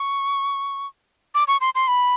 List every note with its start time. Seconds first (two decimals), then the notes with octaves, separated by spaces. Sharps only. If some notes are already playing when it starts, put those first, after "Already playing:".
Already playing: C#6
1.35 D6
1.48 C#6
1.61 C6
1.75 C6
1.88 B5